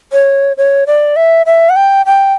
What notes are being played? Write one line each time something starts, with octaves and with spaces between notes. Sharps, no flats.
C#5
C#5
D5
E5
E5
F#5
G5
G5